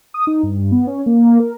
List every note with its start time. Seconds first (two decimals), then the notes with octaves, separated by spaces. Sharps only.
0.14 D#6
0.27 D#4
0.43 G2
0.72 B3
0.87 C#4
1.06 A#3
1.40 A#4